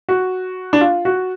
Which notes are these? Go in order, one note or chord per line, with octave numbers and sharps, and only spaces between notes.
F#4
D4
F4
F#4